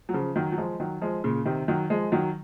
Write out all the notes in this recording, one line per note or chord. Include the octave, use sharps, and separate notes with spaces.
F#3
C#3 F3
D#3 F#3
F#3
F3 G#3
D#3 F#3
F3 G#3
A#2 C#3
C3 D#3
D#3 F#3
F3 G#3
D#3 F#3